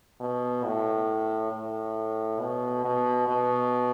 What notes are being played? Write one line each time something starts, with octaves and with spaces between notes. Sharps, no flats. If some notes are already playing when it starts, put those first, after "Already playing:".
B2
A2
A2
B2
B2
B2